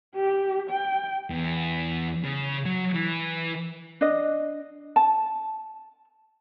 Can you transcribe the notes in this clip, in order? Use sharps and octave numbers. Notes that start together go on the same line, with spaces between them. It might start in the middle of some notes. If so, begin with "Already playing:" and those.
G4
G5
E2
C#3
F#3
E3
D4 D#5
A5